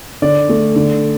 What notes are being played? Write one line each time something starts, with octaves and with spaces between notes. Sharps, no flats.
D3 D5
A3
D3